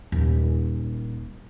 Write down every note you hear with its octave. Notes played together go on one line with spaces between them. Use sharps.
D#1